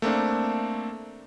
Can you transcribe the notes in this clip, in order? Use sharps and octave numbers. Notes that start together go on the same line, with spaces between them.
A3 A#3 C4 D4